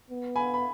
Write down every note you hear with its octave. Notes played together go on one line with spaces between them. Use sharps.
B3
G#5 B5
B5